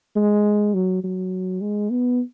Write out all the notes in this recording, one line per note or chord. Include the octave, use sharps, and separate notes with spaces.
G#3
F#3
F#3
G#3
B3